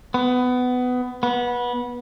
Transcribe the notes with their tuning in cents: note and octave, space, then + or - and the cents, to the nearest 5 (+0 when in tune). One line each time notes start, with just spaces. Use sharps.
B3 +20
B3 -20